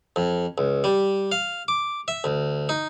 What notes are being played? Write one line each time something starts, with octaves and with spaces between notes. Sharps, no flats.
F2
C#2
G3
F5
D6
E5
D2
D#4